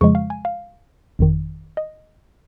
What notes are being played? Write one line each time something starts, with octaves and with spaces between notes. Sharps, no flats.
F2 C#3 F3 G#3 C#6
F5
G#5
F5
G1 F2 D#3
D#5